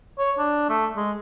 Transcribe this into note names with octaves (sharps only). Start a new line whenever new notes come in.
C#5
D4
A3
G#3